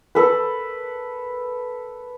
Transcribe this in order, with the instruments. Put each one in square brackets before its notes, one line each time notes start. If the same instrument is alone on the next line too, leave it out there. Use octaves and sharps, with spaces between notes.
[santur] A4 B4